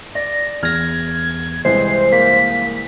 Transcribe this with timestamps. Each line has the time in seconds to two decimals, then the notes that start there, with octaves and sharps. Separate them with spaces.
0.15 D5 A#6
0.63 E2 F6 G#6 A#6
1.65 C2 E3 G#3 C5 C7
2.12 A#3 B6